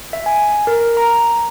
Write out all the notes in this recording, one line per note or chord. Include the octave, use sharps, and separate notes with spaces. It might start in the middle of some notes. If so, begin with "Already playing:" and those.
E5
G#5
A#4
A#5